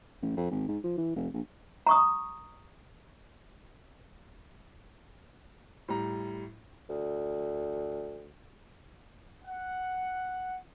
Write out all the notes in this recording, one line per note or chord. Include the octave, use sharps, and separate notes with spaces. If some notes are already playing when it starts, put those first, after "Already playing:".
A1
F2
G#1
G#2
F3
E3
F1
A#1
A#5 C#6 D#6
A2 G3 A#5
D2
F#5